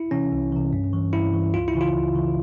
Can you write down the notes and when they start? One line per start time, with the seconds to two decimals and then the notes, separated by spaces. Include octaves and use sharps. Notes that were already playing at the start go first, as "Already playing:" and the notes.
Already playing: E4
0.11 C3 E3 C#4
0.32 C2
0.52 C3 E3
0.73 G2
0.93 E3
1.13 G2 E4
1.34 E3
1.54 C#2 F4
1.68 E4
1.74 C#3 E3
1.81 F4
1.94 C#2
2.15 C#3 E3